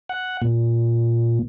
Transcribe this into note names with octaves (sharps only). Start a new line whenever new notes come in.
F#5
A#2